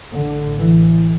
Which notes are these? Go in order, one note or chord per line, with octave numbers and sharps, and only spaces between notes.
A1 A2 D3
E3